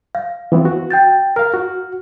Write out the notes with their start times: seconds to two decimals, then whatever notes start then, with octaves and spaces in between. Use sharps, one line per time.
0.15 F5
0.52 E3 B3 C4
0.65 F#4
0.90 G5 G6 A6
1.36 A#4 F5 F6
1.54 F#4